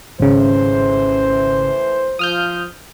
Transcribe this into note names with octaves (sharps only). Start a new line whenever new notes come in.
G#1 C#3 E3 A3 C5
F3 D#6 F6 G6